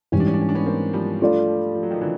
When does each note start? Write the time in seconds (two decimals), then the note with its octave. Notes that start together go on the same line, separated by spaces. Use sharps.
0.12 G#2 E3 G3 C#4
0.20 D4
0.27 C#4
0.34 D4
0.41 C#4
0.49 D4
0.55 B3 C#4
0.66 A#3 C4
0.93 F3 G3
1.20 A3 D4 F4 A4 D5
1.75 F3
1.83 F#3
1.91 D#3 F3
2.01 D3 E3